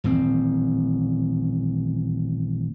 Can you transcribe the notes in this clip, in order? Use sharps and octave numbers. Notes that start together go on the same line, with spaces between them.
D#1 A1 C4